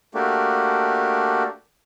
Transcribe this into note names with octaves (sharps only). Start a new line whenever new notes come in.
A3 A#3 D4 F#4 G4